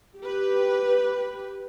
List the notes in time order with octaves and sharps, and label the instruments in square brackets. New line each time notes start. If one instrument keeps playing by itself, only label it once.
[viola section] G4 B4